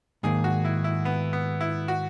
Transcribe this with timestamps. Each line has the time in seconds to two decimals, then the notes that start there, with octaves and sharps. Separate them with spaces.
0.23 G#2 D#3 A#3 G#4
0.44 F#4
0.65 E4
0.84 E4
1.05 B3
1.33 B3
1.61 E4
1.88 F#4